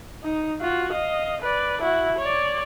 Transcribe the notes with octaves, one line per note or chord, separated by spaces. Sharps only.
D#4
F4 F#4
D#5 F5
B4 D5
E4 F#4
C#5 D5